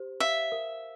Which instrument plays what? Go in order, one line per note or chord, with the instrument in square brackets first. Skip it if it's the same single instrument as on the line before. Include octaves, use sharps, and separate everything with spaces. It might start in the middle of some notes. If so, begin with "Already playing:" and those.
Already playing: [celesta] G4 C5
[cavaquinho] E5 [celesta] F5
[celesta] A#4